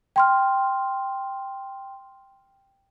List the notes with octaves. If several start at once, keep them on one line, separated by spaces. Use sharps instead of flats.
G5 C6 F6